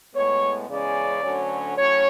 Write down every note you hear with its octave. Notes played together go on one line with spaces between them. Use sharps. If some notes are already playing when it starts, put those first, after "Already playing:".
A2 G#3 B3 C#5
E2 C#3 G#3 C#4 D5
D2 D3 F#3 C#4
A2 F#3 C#4 C#5